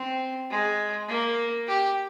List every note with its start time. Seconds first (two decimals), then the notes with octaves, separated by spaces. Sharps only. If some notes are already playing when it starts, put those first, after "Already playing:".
Already playing: C4
0.51 G#3
1.08 A#3
1.67 G4